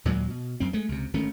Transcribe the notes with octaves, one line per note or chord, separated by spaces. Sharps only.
D#2 A#2 F#3 G#3
B2
F#2 C4
G#3 A3
C#2 C3
G#1 D#3 A3 C#4